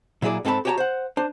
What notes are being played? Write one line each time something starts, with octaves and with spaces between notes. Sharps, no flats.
A#2 F#3 E4 G#4 D5
G#2 C4 A4 C5 A5 B5
F#4 G4 C#5 G5 A5 A#5
C5 F#5
D4 C5